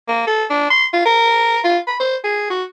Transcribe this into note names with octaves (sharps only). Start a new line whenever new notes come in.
A#3
A4
D4
C6
F4
A#4
F4
B5
C5
G#4
F#4